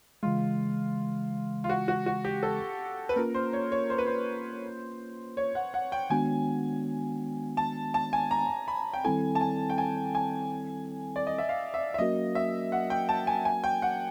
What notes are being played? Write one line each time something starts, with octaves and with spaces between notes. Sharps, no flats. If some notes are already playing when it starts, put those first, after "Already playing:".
C#3 E3 G#3 F4
F4
F#4
F#4
F#4
G4
A4
B4
A#3 C#4 F4 A#4
C5
C#5
C#5
C5
B4
C5
C#5
F#5
F#5
G5
D#3 G#3 B3 D4 F#4 G#5
A5
A5
G#5
A#5
B5
G5
D#3 G3 C4 E4 A4 G#5
A5
G#5
G5
G#5
G#5
D5
D#5
E5
F5
E5
E5
F#3 A#3 C#4 F#4 A#4 D#5
E5
F#5
G5
A5
G#5
G#5
G5
F#5